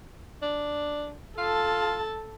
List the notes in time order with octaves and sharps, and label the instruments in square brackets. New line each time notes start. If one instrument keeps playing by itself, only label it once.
[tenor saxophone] D4
[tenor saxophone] F4 [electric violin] A4 A5